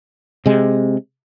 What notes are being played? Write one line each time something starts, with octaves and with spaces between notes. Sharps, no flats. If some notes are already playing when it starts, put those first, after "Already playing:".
C3 G#3